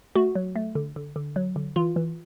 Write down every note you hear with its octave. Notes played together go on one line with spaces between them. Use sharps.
A3 F#4
F#3
A3
D3
D3
D3
F#3
D3
E3 F4
E3